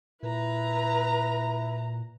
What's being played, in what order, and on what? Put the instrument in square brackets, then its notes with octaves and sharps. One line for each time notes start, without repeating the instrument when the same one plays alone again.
[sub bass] A#2 [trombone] E4 [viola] B4 A#5